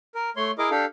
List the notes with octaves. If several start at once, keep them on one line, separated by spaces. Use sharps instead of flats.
A#4
A3 C#5 C6
E4 G#4 A#4 D#5 D6
D4 G4 A4 F5